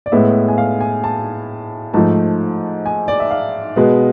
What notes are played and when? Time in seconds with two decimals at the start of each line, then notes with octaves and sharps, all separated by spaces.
0.06 D5
0.12 A2 G#3 B3 E5
0.48 G#5
0.58 F5
0.80 G#5
1.04 A5
1.94 G#2 F3 A3 A5
2.86 G#5
3.08 D5
3.20 E5
3.31 F5
3.76 B2 G#3 B3